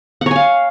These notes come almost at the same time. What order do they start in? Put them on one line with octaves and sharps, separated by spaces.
F#5 C#5 G#5 F5